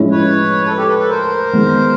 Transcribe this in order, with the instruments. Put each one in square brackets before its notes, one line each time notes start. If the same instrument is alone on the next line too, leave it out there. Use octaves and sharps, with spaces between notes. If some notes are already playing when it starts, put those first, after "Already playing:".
Already playing: [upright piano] A2 F3 G#3 C#4 E4
[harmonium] B4 C#5
A4 B4
G4 A4
A4 B4
A4 B4
A#4 C5
[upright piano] D#3 G#3 B3